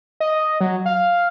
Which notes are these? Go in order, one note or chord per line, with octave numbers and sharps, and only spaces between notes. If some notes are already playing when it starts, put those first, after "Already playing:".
D#5
F#3
F5